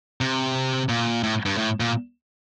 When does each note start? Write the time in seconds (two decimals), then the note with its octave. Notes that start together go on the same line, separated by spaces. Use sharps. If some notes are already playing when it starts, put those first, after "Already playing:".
0.21 C3
0.89 A#2
1.23 A2
1.46 G2
1.58 A2
1.80 A#2